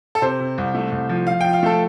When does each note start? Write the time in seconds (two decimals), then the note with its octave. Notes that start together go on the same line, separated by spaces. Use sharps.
0.15 A4
0.22 C3 C5
0.40 C3
0.58 C2
0.75 A3
0.92 C2
1.09 F3
1.27 F3 F5
1.41 F3 G5
1.53 F5
1.63 A3 A4